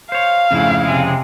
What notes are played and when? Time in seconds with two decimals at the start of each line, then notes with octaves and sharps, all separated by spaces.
0.12 C5 C#5 F5
0.51 F2 G#2 C#3 A3 E4
0.83 C3 G#3